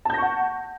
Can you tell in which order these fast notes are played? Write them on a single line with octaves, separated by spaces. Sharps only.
A5 G6 A#6 C#6 F#5